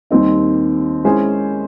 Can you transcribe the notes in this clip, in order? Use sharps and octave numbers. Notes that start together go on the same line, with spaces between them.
D#2 D#3 G3 C4 D#4
G#3 C#4 E4 G#4 C5